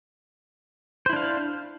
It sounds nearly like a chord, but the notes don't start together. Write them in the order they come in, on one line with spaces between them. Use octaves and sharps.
C5 E4 D4 F5